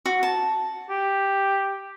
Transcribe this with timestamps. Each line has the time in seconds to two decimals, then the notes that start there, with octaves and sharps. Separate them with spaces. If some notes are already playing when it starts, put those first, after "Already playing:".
0.05 F#4
0.23 A5
0.90 G4